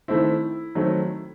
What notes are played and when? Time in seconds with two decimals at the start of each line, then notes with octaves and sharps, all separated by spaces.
0.08 D#3 A3 C4 E4
0.75 D#3 F#3 A3 C4